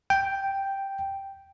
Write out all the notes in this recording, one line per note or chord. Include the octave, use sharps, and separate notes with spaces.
G5